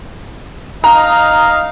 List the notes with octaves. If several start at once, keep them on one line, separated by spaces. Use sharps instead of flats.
D#4 D#5 F5 A#5